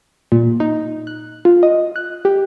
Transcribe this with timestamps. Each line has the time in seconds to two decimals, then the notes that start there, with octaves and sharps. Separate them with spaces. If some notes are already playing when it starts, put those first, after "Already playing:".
0.32 A#2
0.60 D#4
1.07 F#6
1.45 F4
1.63 D#5
1.96 F#6
2.25 G4